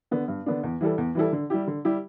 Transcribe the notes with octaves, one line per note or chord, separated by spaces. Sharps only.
D3 B3 D4
G2
D3 B3 D4
E2
E3 G3 E4 A4
E2
E3 G3 E4 A4
D3
G3 E4 G4
D3
G3 E4 G4